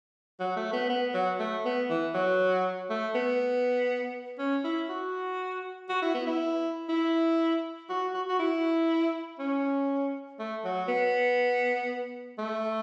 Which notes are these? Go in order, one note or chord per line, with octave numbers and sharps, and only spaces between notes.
F#3
A3
B3
B3
F#3
A3
B3
E3
F#3
A3
B3
C#4
E4
F#4
F#4
E4
B3
E4
E4
F#4
F#4
F#4
E4
C#4
A3
F#3
B3
A3